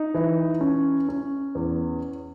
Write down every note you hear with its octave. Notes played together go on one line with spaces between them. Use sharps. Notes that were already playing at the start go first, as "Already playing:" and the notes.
Already playing: D#4
E3
C#4
C#4
E2